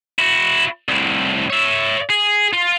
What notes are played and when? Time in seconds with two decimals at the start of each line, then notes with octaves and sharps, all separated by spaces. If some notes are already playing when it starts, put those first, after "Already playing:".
0.19 E4 F#4
0.88 C2 A2
1.50 C#5 E5
2.10 G#4
2.53 F4